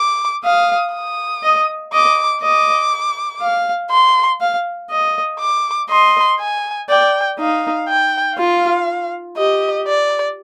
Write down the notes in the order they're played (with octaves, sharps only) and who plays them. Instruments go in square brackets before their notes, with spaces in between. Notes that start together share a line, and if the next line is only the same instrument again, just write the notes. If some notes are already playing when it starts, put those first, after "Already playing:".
Already playing: [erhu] D6
[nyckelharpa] F5 [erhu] D#6
[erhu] D#6
[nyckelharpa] D#5
[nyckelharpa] D#5 [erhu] D6
[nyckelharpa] D#5 [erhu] D6
[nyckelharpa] F5
[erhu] C6
[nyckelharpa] F5
D#5
[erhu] D6
[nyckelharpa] D#5 [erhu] C6
[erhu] G#5
[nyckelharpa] D5 [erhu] G5
[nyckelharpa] D#4 [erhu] F5
[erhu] G5
[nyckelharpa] F4 [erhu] F5
[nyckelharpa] G4 [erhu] D#5
[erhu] D5